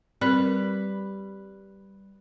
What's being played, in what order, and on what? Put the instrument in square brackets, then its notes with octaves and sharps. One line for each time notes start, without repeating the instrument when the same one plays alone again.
[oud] G3 [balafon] C4 A#4 [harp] B4